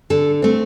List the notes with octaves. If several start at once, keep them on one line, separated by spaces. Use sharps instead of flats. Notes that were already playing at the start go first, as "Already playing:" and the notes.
D3 A4
A3 C4